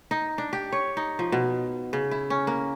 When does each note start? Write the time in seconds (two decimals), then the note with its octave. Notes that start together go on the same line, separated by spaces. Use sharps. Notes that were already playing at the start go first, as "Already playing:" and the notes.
0.11 D#4
0.38 D4
0.53 G4
0.72 C#5
0.97 D#4
1.19 F3
1.32 B2
1.93 C#3
2.11 E4
2.30 C#4
2.47 A#3